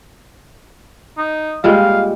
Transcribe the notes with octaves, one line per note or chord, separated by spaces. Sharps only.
D#4
A#2 G3 G#3 F5